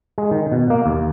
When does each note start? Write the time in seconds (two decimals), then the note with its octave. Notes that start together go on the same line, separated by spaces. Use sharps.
0.18 G#3
0.31 D#3
0.51 B2
0.70 A#3
0.86 D#2